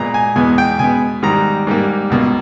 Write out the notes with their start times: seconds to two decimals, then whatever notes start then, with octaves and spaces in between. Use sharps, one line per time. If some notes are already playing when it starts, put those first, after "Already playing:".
Already playing: A#2 G#3 B3 A#5
0.14 G#5
0.36 E2 B2 G#3 B3 G#5
0.58 G5
0.79 B2 G#3 B3 G#5
1.22 G#2 D#3 G3 A#5
1.67 G#2 G3 A#3
2.10 C#2 B2 A#3